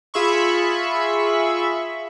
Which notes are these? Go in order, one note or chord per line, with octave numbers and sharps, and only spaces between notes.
F4 G#4 E5 B5 C#6